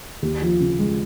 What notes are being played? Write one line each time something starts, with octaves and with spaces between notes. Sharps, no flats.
D#2
F3
C#3
G#3